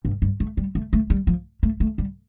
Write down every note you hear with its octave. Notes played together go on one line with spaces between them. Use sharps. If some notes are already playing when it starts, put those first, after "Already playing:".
G2
G2
A3
G3
A3
A3
G3
F3
A3
A3
G3